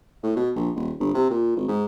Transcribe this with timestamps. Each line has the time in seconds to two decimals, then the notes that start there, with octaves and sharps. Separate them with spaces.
0.23 A2
0.36 B2
0.56 A#1
0.75 D#1
0.99 G1
1.14 C3
1.31 A#2
1.56 G#1
1.68 G#2